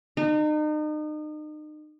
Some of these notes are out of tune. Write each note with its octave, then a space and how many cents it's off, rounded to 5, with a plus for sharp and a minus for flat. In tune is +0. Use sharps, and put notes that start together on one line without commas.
D#4 -35